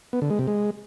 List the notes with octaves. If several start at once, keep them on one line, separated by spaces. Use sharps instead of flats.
B3
D3
G#3
C3
G#3